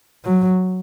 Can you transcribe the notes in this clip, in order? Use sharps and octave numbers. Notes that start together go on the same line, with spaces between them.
F#3